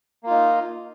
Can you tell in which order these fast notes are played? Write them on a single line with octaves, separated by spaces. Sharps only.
A#3 F4 D#4